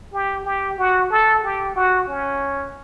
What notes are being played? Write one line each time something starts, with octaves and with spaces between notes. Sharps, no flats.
G4
G4
F#4
A4
G4
F#4
C#4